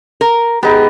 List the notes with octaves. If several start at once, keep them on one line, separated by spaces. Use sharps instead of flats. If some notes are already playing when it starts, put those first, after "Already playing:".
A#4
B3 D#4 G4 G#4